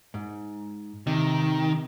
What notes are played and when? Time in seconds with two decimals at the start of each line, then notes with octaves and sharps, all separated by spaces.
0.14 G#2
1.07 C3 D#3